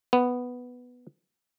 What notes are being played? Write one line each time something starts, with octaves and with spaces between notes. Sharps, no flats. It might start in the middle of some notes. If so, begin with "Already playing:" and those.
B3